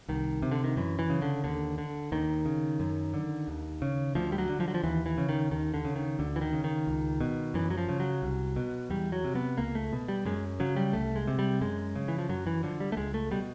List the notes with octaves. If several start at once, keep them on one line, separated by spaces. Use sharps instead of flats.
C2 D#3
C3
D3
D#3
F#2 E3
E3
C#3
D3
D#2 D3
D3
D#2 D#3
C#3
F#2
D3
D#2
C#3
D2 F3
G3
F#3
D3
F3
F#3
F3
D#2 E3
E3
C#3
D#3
D#2 D#3
D3
C#3
D#3
D2 D3
E3
D#3
C#3
D#3
C#2
B2
F#2 E3
F#3
F3
C#3
F#3
C2
B2
E2 G3
F#3
C3
B3
C#2 A#3
A3
B2
G3
F#2 G#3
C#3 F#3
G3
C2 A3
G#3
C3
G3
F#2 G#3
C#3
E3
F3
F#2 F#3
E3
D3 F3
G3
A3
C#2 G#3
A3
B2 G3